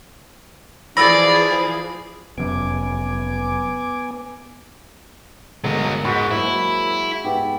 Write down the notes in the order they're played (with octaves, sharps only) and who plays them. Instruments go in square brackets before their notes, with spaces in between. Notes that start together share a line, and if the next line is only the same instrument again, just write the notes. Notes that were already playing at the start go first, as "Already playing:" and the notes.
[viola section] E3 F3 G#4 [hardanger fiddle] D5 [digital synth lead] B5 [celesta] E6 A#6
[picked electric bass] F1 F#2 [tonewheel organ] B3 G#5 D6
[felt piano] G1 G#3 [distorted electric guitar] F#3 D#5 [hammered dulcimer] A#4 F#5
[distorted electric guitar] G#2 [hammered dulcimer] G#3 F#4 [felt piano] B5 B6
[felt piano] F#3 A#3 C5 [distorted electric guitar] E4
[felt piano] G#2 [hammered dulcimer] B3 G4